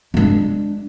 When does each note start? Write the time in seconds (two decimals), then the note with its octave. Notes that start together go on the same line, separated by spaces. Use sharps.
0.14 G#3 D4